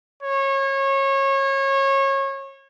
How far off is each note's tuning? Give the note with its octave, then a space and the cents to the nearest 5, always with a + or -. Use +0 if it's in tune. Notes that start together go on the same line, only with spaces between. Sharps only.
C#5 -25